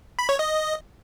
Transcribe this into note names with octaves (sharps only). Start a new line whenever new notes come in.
B5
C#5
D#5